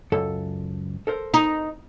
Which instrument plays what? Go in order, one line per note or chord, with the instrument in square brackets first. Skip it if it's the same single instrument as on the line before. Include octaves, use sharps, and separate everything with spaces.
[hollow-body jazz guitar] C#2 F#2 A4
A4 A#4 C5
[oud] D#4